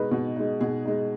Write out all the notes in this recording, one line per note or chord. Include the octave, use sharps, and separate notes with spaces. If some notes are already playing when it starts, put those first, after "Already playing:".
Already playing: B2 G#3 D#4 B4 D#5
B2
G#3 D#4
B2 G#4
G#3 D#4